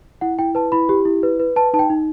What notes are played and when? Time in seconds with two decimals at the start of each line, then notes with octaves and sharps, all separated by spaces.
0.21 E4 F#5
0.39 E4 G5
0.55 B4 A5
0.72 E4 B5
0.89 G4
1.05 E4
1.23 B4
1.40 B4
1.56 B4 A5
1.74 D#4 A5
1.79 G5
1.90 D#4